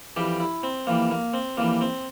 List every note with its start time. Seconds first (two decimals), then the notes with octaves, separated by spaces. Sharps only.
0.16 F2 E3 G3 G4
0.40 E4
0.63 C4
0.87 F2 E3 G3 A#3
1.11 A#3
1.34 C4
1.57 F2 E3 G3 A#3
1.81 C4